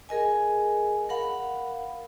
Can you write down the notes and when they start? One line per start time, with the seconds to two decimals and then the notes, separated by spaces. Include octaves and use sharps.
0.09 G#4 A#4 D#5 G#5
1.09 A#4 F5 F#5 B5